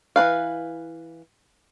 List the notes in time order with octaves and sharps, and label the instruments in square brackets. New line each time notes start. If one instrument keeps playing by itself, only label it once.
[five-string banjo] E3 C4 B4 F5